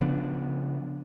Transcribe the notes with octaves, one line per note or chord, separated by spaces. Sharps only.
C#3 F3 B3 D4